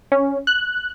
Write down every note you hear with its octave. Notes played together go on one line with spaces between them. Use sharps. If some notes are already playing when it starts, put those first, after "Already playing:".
C#4
F#6